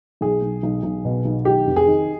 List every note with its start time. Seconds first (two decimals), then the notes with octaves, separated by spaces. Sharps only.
0.21 B1 G#4
0.42 B1
0.63 B1
0.83 B1
1.05 B2
1.25 B1
1.45 D#3 G4
1.67 F1
1.76 G#4
1.87 D#3